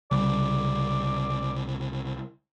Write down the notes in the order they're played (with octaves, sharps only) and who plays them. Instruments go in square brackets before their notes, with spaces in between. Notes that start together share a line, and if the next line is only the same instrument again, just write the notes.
[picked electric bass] C2 C#3 G3 [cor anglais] D5